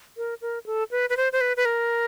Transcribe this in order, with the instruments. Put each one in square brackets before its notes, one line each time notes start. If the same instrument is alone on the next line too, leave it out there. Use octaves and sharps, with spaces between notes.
[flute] A#4
A#4
A4
B4
B4
C5
C5
B4
B4
A#4